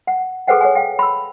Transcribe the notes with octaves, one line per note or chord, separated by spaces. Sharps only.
F#5
G#4 A4 B4 C5 F#5 G5
C#5 F#5 G#5
F5 G5
B5 E6